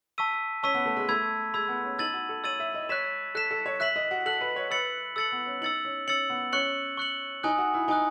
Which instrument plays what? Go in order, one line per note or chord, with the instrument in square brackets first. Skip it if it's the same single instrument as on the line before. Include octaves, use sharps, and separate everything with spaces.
[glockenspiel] A5 C#6 E6 B6 D#7
[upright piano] C#4 [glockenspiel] A5 C#6 E6 B6 D#7
[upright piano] B3
A3
G#3
[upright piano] A3 [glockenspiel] B5 E6 G#6
[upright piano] G#3 [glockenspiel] B5 E6 G#6
[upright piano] B3
C#4
[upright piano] D#4 [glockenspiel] E6 A6 D#7 F#7
[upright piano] F#4
A4
[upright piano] C#5 [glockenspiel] E6 A6 D#7 F#7
[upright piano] E5
D#5
[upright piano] C#5 [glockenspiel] F#6 B6 E7
[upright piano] A4 [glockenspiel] F#6 B6 E7
[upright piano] A4
C#5
[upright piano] E5 [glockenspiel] F#6 B6 F#7
[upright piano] D#5
F#4
[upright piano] A4 [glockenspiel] F#6 B6 F#7
[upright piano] B4
C#5
[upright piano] B4 [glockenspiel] E6 A6 C#7 F#7
[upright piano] A4 [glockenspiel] E6 A6 C#7 F#7
[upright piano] B3
C#4
[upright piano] D#4 [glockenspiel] E6 A6 C#7 F#7
[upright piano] C#4
[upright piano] C#4 [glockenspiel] E6 A6 C#7 F#7
[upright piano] B3
[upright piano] C#4 [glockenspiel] C#6 F#6 C#7 F#7
[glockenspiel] C#6 F#6 C#7 F#7
[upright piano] D#4 [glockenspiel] G#5 D#6 F#6
[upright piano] F#4
E4
[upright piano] D#4 [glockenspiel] G#5 D#6 F#6